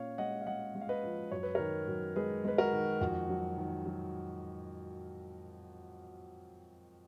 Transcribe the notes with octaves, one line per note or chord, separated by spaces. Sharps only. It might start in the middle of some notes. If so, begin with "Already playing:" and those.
Already playing: A#2 C#4 C#5 F5
G#3 D#5 F#5
F5
G#3 D#5 F#5
G#3
F5
B4 D#5
F3
F#2 C#5
B4
D#3 A#4 C#5
F#2
G#3 G#4 B4
G#3 B4
F#4 A#4
D#3
F2 F#4
F#3
D#3
F#3